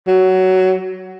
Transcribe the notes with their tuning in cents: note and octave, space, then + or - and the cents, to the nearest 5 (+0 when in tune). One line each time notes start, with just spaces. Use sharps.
F#3 +15